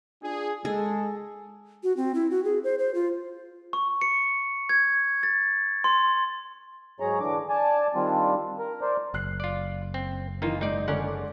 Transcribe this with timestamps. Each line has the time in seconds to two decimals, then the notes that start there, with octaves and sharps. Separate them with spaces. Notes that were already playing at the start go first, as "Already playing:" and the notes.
0.23 D4 F4 G#4
0.65 G#3 G#4 A4
1.83 F#4
1.97 C4
2.15 E4
2.31 F#4
2.45 G#4
2.64 C5
2.79 C5
2.95 F4
3.73 C#6
4.01 C#7
4.69 G#6
5.23 A6
5.84 C6
7.00 G#2 F#3 G#4 C#5 A#5
7.20 D3 E3 D4 D6
7.49 D5 G#5 A5
7.95 D#3 G3 C4 D4 F4
8.59 A#4
8.81 A#4 C5 D5
9.14 F#1 F6 F#6 C7
9.40 F4 D5
9.94 C4
10.42 D#3 E3 A#3 D#4 F4
10.61 G#2 D#4 D5 D#5 G6
10.88 D3 G#3 C#4 D4 A#4 F#5